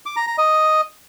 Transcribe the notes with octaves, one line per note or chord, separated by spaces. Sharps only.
D6
A#5
A#5
D#5